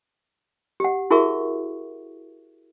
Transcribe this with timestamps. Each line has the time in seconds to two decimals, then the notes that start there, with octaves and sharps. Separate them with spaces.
0.80 G4 F#5
1.11 E4 F#4 G#4 A#4 E5 C#6